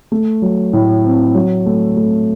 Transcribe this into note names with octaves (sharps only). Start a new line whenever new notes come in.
A3
F#3
A2
C4
F#3
A3
A3